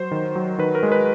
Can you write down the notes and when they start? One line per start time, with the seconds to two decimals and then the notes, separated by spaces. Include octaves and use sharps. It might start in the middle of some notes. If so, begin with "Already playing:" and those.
Already playing: F#3 C5
0.11 D#3
0.36 F#3
0.58 D#3 B4
0.75 A#4
0.83 G#3
0.92 B4